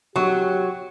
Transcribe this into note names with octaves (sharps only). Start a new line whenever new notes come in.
F#3 G4 C#6